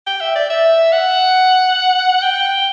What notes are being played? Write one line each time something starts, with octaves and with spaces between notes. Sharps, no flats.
G5
E5
D5
E5
F#5
G5